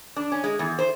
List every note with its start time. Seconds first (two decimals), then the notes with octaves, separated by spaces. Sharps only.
0.16 D4
0.32 C#4
0.44 G#3
0.59 E2
0.79 C5